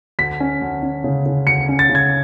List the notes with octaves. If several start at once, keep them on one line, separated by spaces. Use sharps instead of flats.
D2 B6
C#4
D2
C#4
C#3
C#3
D2 C#7
C#4
A6
C#3
G#6